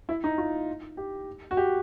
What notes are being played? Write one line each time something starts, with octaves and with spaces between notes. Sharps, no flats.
E4
D#4
F4
G4
F#4
G4